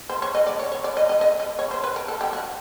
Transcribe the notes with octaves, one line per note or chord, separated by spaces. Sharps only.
C5
C#5
D#5
D5
C#5
C#5
D5
D#5
D#5
D#5
D#5
C#5
C5
B4
A#4
A4
G4
F#4